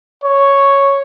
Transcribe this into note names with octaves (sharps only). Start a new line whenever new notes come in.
C#5